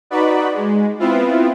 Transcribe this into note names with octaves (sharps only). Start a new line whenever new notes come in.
D#4 F#4 B4 D5 B5
G#3
B3 C4 E4 F4